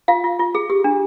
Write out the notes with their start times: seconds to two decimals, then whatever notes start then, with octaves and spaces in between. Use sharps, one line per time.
0.08 F4 F5
0.24 F4
0.39 F4
0.55 G#4
0.70 G4
0.84 D4